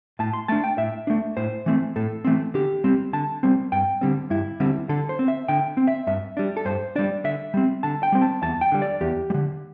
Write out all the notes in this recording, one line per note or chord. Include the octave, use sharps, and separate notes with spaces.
A2 A5
C6
A3 D4 A5
G5
A2 E5
A3 D4
A2 C5
E3 A3 C4
A2 A4
E3 A3 C4
D3 G4
G3 C4
D3 A5
G3 C4
G2 G5
D3 G3 C4
G2 E4
D3 G3 C4
D3 A4
C5
C4
E5
D3 G5
C4
E5
G2 E5
G3 D4
A4
G2 C5
G3 D4 D5
D3 E5
G3 C4
D3 A5
G5
G3 C4
A5
E2 A5
G5
D3 G3
D5
E2 G4
G3
D3